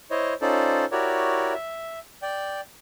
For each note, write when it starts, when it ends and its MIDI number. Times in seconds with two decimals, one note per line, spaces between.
0.11 0.34 64
0.11 0.34 72
0.11 0.34 73
0.11 0.34 75
0.41 0.85 61
0.41 0.85 63
0.41 0.85 65
0.41 0.85 69
0.41 0.85 72
0.41 0.85 74
0.92 1.54 64
0.92 1.54 66
0.92 1.54 67
0.92 1.54 70
0.92 1.54 73
0.92 1.54 74
1.54 1.99 76
2.22 2.61 74
2.22 2.61 79